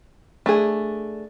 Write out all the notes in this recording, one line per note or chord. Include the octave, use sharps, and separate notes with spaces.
A3 D4 G#4